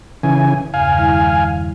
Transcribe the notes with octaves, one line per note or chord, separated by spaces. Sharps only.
C#3 E3 G#5
E2 G2 C#3 F5 G#5
D#3 G3 E4